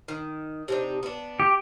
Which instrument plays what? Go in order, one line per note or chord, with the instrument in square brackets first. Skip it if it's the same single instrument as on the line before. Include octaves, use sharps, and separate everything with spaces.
[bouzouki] D#3
C3 D4 D#4
B3 D4
[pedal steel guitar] G4